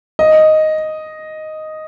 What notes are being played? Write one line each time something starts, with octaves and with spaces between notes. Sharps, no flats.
D#5